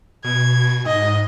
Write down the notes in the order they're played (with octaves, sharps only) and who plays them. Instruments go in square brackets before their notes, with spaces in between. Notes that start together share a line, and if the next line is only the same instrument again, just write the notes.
[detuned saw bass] B2 [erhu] G#6
[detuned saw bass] G#2 [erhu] D#5